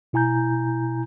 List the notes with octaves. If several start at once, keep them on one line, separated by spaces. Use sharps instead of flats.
B2 E4 G#5 A#5 G6